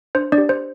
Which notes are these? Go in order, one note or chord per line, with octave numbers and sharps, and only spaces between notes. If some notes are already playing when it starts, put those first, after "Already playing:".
D4 C5
D4 D5
G4
C5